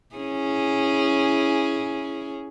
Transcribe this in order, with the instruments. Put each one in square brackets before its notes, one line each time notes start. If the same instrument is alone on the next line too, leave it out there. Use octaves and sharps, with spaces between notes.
[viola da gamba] C#4 E4 G#4